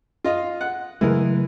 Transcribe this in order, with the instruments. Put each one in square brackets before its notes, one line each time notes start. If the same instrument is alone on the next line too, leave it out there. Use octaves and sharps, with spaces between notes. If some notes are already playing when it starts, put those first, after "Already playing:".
[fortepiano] F4 D#5 F5
F#5
[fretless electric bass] C#3 F#3 A3 [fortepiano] E3 G#3 A#4